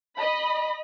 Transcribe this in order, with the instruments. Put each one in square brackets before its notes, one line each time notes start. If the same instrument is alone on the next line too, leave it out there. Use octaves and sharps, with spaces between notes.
[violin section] D#5 B5